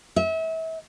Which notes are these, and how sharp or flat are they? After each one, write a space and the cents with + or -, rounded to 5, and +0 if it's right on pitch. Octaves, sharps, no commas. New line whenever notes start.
E5 -35